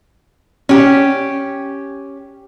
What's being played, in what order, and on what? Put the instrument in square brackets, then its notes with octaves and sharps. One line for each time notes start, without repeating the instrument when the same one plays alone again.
[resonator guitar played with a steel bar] C#4 G4